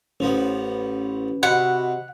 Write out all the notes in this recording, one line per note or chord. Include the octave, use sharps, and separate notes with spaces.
A1 F3 B3 C#4 B4
C3 F#4 D#5 F#5 B5